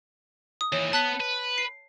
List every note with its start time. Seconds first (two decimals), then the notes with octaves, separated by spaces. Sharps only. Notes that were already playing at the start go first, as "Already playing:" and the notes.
0.61 D#6
0.72 D#2 E3 C#5
0.93 B3 A5 F#6 B6
1.20 B4
1.58 C7